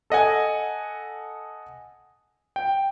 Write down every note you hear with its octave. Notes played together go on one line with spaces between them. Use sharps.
A4 D#5 F#5 G#5
G5